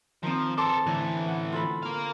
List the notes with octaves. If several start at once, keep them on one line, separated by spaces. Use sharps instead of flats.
D#3 F3 C4
A4 A#4 A5 C6 D6
A2 D3 E3
F#5
F4 A4 B5
A#4 F5